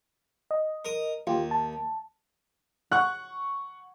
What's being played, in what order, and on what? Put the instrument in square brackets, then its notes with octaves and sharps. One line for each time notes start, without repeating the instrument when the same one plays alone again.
[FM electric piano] D#5
[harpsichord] A#4 D#6
[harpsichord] D#2 [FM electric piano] F4 G4
[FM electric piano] A5
[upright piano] F#5 C#6 [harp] F#6